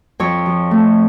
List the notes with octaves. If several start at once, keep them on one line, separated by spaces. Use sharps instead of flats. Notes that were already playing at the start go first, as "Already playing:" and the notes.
F2 C#5
F3
A3